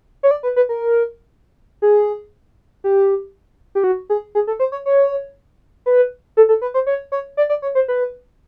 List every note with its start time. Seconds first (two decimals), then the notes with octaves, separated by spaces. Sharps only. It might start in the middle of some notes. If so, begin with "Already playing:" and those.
0.23 C#5
0.31 D5
0.43 B4
0.56 B4
0.69 A#4
1.82 G#4
2.84 G4
3.75 G4
3.84 F#4
4.10 G#4
4.35 G#4
4.47 A4
4.60 C5
4.72 C#5
4.86 C#5
5.86 B4
6.37 A4
6.49 A4
6.62 B4
6.74 C5
6.87 C#5
7.12 C#5
7.37 D5
7.49 D5
7.62 C#5
7.75 C5
7.88 B4